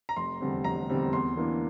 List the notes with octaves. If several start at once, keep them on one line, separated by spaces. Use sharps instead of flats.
A#5
F1 C6
E2 D3 G3 C4
F1 A#5
E2 D3 G3 C4
E2 C6
E3 A#3 D4